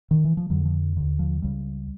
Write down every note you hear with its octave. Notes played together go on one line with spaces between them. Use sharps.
D#3
E3
F3
F2 D3 F#3
F3
D#2 D3
F3
C#2 C#3 G3